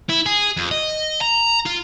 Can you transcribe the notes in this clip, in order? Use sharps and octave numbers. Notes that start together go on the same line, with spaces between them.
E4
G#4
F2
D#5
A#5
F4